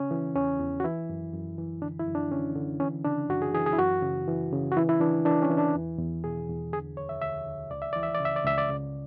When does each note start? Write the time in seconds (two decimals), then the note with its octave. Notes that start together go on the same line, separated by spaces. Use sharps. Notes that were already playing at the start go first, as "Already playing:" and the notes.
Already playing: C#3 C#4
0.11 E3
0.35 E2 C#4
0.60 E2
0.80 F#4
0.84 E3 E4
1.09 F#2
1.33 F#2
1.58 E3
1.82 D3 D4
1.99 E4
2.07 F#2
2.15 D4
2.31 D3 C#4
2.56 D3
2.80 E3 C#4
3.05 C#3 D4
3.29 F#2 F#4
3.42 G#4
3.54 E3 G#4
3.66 G#4
3.73 E4
3.79 F#2 F#4
4.03 C#3
4.27 E3
4.53 C#3
4.72 F#4
4.76 E3 E4
4.89 E4
5.01 E3 D4
5.25 E3 D4
5.42 C#4
5.50 E3
5.58 D4
5.74 E2
5.99 E2
6.24 B2 G#4
6.49 E2
6.73 D3 G#4
6.97 D2 C#5
7.09 E5
7.22 D2 E5
7.46 D2
7.71 C#2 D5
7.82 E5
7.93 E3 D5
8.03 E5
8.15 D5
8.20 C#3
8.25 E5
8.36 D5
8.45 C#2 E5
8.58 D5
8.70 C#3